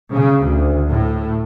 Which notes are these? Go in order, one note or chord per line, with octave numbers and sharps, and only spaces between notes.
C#3
D2
A2